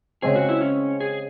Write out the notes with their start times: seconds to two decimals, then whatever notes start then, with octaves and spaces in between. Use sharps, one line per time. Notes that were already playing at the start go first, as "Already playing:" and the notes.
0.22 C#3 G#3 C4 G#4
0.36 F#4
0.49 E4
0.61 C#4
1.00 G#4